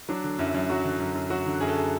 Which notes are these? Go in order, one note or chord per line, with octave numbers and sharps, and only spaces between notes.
F#3 D4
D3
F#2 E4
F#2
F#3 F#4
D3
F#2
F#2
F#3 F#4
D3
F#2 G#4
A4
G#4